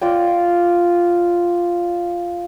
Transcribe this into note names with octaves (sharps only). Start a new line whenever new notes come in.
F4 D5 G5